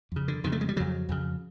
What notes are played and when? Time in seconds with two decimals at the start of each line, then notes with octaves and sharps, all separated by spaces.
0.12 F2 C#3
0.28 D3
0.44 F2 D#3
0.47 C#3
0.52 A3
0.61 G#3
0.69 G3
0.76 F2 C#3 F#3
1.09 F2 C#3